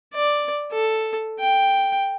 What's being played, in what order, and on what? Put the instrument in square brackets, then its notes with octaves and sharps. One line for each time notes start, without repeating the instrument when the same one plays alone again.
[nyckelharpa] D5
A4
G5